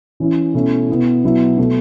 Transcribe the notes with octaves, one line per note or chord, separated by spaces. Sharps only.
E3 C#4 E4
B2 A3 C#4 E4
B2 B3 E4
B2 F#3 B3 E4
B2 A3 E4